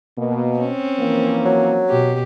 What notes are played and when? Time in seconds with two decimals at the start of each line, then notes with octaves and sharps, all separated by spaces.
0.16 B2 A#3
0.58 C4 C#4
0.97 E3 F3 A#3
1.45 F#3
1.89 B2 G4